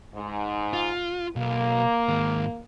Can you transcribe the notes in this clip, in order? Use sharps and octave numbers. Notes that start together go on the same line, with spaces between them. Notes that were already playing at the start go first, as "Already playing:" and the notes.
G#2
F4
B1 A#3
G#2 D#3